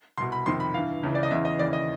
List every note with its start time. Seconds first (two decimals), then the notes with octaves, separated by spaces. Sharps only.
0.18 C2 B2 C6
0.32 B5
0.46 F2 C3 D#3 C6
0.60 B5
0.74 G2 E3 F5
1.03 C#2 C#3 E3
1.15 D5
1.23 D#5
1.31 E2 C#3 E3 E5
1.45 D#5
1.59 D#2 C#3 E3 D5
1.73 D#5